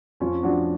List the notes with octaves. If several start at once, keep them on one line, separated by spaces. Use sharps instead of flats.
F2 C#4 F4
F3 D4 F#4